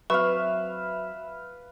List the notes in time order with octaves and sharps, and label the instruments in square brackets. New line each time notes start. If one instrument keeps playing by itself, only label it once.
[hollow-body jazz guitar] F#3 C4 [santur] B4 F5 [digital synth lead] E5 [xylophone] C#6